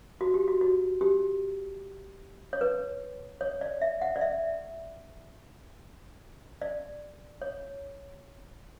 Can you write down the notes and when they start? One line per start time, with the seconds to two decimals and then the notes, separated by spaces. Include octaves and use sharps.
0.21 F#4
0.34 G4
0.48 F#4
0.61 F#4
1.01 G4
2.53 C#5
2.61 B4
3.41 C#5
3.61 D5
3.82 E5
4.02 F#5
4.16 D5
4.21 E5
6.61 D5
7.42 C#5